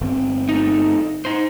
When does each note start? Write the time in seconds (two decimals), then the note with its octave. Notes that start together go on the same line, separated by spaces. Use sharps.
0.01 G1 C4
0.49 A3 D#4
1.25 D#4 C5